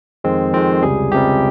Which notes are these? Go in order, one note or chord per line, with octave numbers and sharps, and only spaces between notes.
F2 D#3 G#3 C4
F2 D#3 G#3 C4
C#2 C3 G3 G#4
C#2 C3 G3 G4